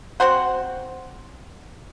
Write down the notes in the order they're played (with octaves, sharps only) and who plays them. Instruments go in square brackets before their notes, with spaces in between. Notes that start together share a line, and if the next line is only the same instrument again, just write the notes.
[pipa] C4 F#4 C5 F#5